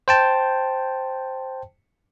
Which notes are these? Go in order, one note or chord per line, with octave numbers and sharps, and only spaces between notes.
C5 G5 A5